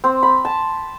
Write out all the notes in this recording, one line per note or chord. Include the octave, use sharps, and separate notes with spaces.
C4
B5
A5